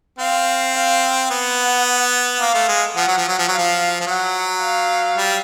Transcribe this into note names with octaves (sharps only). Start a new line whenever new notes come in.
C4 F5
F5
B3 F#5
A#3 F5
A3
G#3
F3 F#5
F#3
F3
F#3
F3
F#3 F5
F3
F3
F#3 F#5
F5
G3